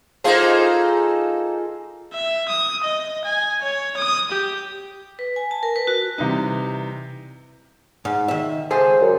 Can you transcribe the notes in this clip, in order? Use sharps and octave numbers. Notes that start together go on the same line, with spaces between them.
A#3 D#4 F4 G#4 A4 C5
E5
D#6
D#5
G#5
C#5
D#6
G4
B4
G#5
A5
A#4
B4
F#4
C3 E3 G3 D#4
G#2
D#3 E5
C#2 G#4 A4 C5
F#2